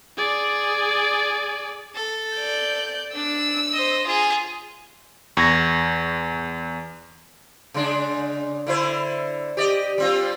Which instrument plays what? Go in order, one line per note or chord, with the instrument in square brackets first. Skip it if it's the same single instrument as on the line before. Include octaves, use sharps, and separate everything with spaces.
[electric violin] G#4 D5
[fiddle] A4
[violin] D5 G6
[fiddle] D4 [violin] E6
[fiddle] C5 D#5
F4 G#4
[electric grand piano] E2 [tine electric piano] C#6 G#6 A#6
[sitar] C#3 G#3 D4
D3 E4 C5
G4 D5 D#5
G3 C4 F4